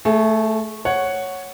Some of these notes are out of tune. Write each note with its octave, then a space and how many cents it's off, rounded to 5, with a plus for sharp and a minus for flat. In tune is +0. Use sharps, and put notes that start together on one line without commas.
A3 +0 G#4 +35
C#5 +0 F#5 +0